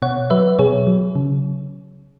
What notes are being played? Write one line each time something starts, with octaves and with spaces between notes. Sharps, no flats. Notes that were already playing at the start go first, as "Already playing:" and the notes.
B2 C#5 F#5
F#3 B4 E5
B2 G#4 C#5
F#3
C#3